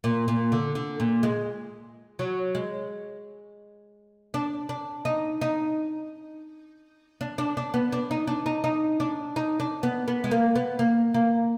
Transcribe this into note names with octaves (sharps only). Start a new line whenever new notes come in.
A#2
A#2
D3
D3
A#2
G#3
F#3
G#3
D4
D4
D#4
D#4
D4
D4
D4
B3
D4
D#4
D4
D#4
D#4
D4
D#4
D4
B3
B3
G#3
A#3
B3
A#3
A#3